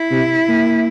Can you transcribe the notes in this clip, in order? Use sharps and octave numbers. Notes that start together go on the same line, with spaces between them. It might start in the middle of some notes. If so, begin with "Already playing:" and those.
Already playing: E4
C3
A#3